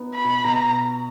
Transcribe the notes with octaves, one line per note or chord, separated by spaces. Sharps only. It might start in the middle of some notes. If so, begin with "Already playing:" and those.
Already playing: B3 D#4
B5
B2
B2 A#5